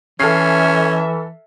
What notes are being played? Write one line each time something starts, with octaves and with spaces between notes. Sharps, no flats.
E3 C#4 A4 E5 F6 C7